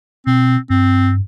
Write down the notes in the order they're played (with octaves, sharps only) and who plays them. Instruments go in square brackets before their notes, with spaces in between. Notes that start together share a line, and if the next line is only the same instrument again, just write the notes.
[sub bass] B2 [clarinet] C4
[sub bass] G2 [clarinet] C4